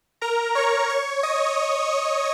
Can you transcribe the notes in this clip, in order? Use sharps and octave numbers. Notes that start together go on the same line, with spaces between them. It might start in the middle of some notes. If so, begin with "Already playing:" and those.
A#4 A#5
C#5 C#6
C#5 C#6
D#5 D#6